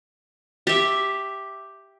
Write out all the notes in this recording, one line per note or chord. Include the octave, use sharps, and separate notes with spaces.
G4 E5